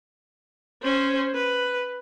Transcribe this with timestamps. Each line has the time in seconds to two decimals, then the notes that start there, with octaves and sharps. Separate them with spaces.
0.83 C#4 C5
1.34 B4